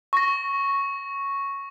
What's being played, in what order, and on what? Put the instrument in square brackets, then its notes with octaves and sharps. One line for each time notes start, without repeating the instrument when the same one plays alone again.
[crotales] C#6 A#6